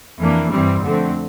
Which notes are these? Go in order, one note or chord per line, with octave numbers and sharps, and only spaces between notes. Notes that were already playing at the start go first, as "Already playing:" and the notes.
F2 E3 A#3 D4
G2 E3 G3 C4
F2 D3 A3 C4